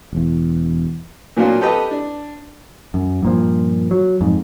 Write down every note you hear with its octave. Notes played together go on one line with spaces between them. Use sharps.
E1 E2
A#2 F#3 A#3 D4 F4
G4 A4 B4 D#5
D4
F#2
G2 A#2 F3
F#3
F2 G#2